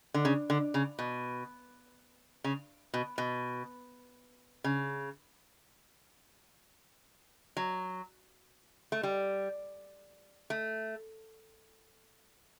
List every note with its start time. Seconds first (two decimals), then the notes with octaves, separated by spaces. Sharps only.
0.14 D3
0.25 C#3
0.50 D3
0.74 C#3
0.99 B2
2.44 C#3
2.94 B2
3.18 B2
4.64 C#3
7.57 F#3
8.92 A3
9.03 G3
10.50 A3